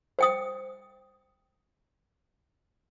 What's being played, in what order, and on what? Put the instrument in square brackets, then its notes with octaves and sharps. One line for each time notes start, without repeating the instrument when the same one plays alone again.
[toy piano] C5 G5 D#6